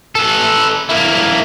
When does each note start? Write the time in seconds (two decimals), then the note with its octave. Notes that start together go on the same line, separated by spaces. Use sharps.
0.15 A4 B4
0.89 A#3 E4